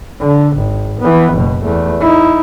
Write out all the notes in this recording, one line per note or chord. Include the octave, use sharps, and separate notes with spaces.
D3
G#1
E3 B3
F#1 B2
E2 A3
D#4 E4